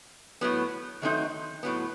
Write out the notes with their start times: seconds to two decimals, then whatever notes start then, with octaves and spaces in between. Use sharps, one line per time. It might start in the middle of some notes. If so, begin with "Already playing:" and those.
0.41 A2 F#3 B3
1.02 D#3 F#3 A3 C4 D#4
1.63 A2 F#3 B3